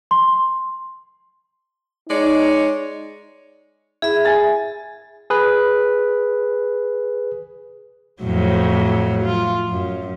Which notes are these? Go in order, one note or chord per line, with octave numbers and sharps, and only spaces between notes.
C6
G#3 D#4 C#5 D5
E4 G#4 E5
G#5 A6
G#4 B4
F2 A2 F#3
F4
F#2